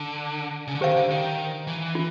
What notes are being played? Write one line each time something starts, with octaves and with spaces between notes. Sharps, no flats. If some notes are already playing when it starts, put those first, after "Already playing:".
Already playing: D3
C#3
D3
D#3 G4 C5 F5
D3
D#3
E3
F4